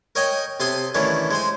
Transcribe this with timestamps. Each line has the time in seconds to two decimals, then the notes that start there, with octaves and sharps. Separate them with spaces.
0.15 A#4 C#5 D#5 G5 G#5 A#5
0.60 C3 A4 G#5 C6 D#6
0.95 D#3 E3 A3 C#4 D4
1.31 G#3 C5 G#5